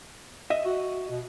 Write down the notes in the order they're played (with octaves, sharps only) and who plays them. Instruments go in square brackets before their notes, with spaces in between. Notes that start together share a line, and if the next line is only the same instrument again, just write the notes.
[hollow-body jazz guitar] D#5 E5
[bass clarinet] F#4
B2